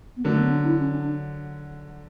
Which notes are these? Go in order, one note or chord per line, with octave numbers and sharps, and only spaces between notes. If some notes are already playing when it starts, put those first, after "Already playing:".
B3
D3 F#3 A3
B3
D4
E4
C#4
D4